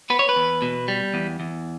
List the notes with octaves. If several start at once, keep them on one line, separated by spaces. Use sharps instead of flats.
B3 B4
C#5
B4
E2
B2
G3
E2
E2